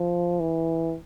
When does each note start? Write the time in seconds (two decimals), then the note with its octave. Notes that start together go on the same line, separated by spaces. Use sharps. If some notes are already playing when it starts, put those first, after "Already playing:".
Already playing: F3
0.40 E3